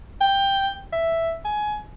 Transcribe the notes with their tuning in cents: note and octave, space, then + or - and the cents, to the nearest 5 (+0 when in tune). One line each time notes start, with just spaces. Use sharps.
G5 +5
E5 +0
G#5 +20